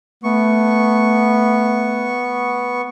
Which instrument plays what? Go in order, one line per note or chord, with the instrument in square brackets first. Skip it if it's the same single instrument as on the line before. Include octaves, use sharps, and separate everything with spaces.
[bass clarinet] A3 [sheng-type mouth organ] B3 C#6